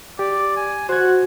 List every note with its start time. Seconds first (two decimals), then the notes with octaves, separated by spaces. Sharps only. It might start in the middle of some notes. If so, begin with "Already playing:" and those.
0.19 G4 D5
0.56 G#5
0.89 F#4 C5 F#5 G#6